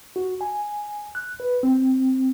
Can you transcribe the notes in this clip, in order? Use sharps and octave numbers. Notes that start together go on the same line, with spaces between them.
F#4
G#5
F#6
B4
C4